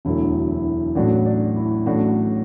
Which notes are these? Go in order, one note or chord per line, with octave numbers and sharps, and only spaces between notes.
E1 D2 D3 F#3 A3 E4
E4
A1 A2 F#3 D4 F#4
D4
E4
A1 A2 F#3 A3 D4 F#4